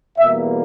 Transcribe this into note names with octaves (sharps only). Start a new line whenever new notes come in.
E2 B2 G3 A#3 E5